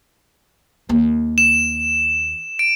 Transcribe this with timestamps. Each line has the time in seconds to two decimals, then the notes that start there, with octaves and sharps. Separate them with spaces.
0.89 D#2 A#3
1.38 E7
2.59 D7